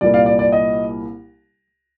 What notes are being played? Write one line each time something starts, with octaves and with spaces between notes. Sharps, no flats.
C2 A#2 G3 A#3 D5
D5 F5
D5
D5
D#5